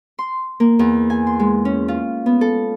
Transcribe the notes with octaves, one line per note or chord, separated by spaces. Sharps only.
C6
A#3
E2
G#5
C6
G#3
C#4
F4
B3
A4